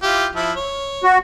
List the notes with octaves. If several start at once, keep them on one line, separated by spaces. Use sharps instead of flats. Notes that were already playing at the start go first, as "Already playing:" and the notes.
E4 F4 G4
F3 E4
C#5
F#4